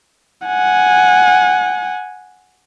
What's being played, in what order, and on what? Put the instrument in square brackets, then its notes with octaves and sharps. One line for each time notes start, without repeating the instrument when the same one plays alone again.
[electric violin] F#5 G#5